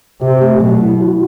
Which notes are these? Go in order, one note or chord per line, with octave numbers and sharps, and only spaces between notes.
C3 G4
A3
B2 F#3
E4
F#4